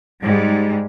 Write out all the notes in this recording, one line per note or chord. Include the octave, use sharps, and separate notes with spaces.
G#2 G3 G#3